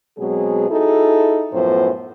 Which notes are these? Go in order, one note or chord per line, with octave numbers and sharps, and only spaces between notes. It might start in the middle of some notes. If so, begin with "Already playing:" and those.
B2 F#3 G#3 C4 G#4
D#4 E4 F#4 G#4 A4
F#2 A2 F3 B3 F4 C5